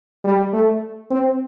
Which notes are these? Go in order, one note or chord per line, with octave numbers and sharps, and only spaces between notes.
G3
A3
C4